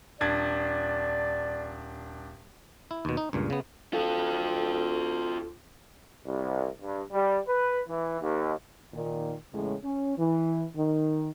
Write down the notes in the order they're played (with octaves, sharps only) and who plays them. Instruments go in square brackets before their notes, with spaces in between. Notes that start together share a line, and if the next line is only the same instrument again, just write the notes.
[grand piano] D#1 D4 G#6 [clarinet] D5
[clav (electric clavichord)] E4
D#2 B2
D#4
C#2 G2 A#2
C#3 B3
[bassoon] D2 [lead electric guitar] F4 A4
[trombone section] C2
G2
G3
B4
E3
D#2
[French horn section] A#2 D#3
E2 A2 C#3 G#3
C#4
E3
D#3